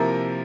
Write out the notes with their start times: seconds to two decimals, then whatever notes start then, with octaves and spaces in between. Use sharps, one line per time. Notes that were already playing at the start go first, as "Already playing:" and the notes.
Already playing: C3 F3 A#3 E4 A#4 A#5